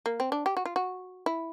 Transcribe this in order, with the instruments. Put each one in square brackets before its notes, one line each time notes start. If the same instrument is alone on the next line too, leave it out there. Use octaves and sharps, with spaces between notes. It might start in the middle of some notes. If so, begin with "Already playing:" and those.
[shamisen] A#3
C4
D4
G4
F#4
F4
F#4
E4